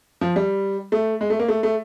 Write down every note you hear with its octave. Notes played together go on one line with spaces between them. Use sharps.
F3
G3
A3
G#3
A3
A#3
A3
A3